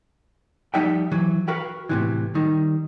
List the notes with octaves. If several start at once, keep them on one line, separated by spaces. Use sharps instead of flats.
F3 G3 D#4 E5 F#5 G5
E3 F#3
F#4 A#4 B4 F5 G5
A2 C3 E3
D#3 G3